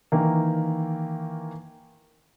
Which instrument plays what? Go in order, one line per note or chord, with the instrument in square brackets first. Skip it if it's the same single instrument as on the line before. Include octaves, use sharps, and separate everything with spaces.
[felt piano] D#3 E3 A#3